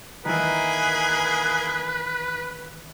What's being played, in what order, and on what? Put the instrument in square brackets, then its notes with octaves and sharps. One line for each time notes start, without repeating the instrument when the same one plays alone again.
[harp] D#3 E3 [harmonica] A#3 G#4 [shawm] B4